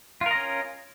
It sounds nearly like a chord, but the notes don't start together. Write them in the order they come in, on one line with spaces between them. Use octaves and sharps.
F4 A#4 D#5 C#4